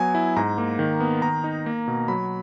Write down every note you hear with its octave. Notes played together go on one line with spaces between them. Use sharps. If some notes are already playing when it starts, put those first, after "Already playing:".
Already playing: F#3 B3 G#5
E4
G#2 A#5
A#3
D#3
B3
D#3 A#5
D#4
A#3
B2
F#3 B5